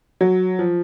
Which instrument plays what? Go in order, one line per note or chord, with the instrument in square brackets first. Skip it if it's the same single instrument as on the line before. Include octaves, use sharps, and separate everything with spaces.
[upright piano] F#3
F3